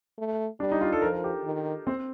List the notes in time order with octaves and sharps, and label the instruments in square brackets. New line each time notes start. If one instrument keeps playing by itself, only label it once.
[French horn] A3
[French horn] G3 [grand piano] D4
[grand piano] D#4
F4
A4
[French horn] F3 [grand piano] A#4
[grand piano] A#4
G4
[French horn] D#3
[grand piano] C4